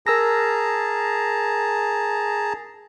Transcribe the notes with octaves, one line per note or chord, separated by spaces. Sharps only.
G#4 A#4 A5 A#5 E6 A#6